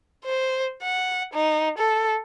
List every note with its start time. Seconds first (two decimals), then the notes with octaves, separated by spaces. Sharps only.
0.25 C5
0.83 F#5
1.34 D#4
1.78 A4